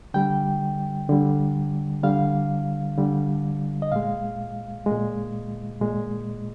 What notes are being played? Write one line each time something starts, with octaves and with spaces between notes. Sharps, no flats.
D3 G3 G5
D3 G3
D3 G3 F5
D3 G3
D#5
A#2 G#3 F5
G#3
A#2
A#2 G#3